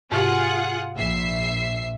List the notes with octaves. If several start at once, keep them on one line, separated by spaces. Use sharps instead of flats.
G#2 C3 F4 G4 G#4 F#5
A#1 E5 C7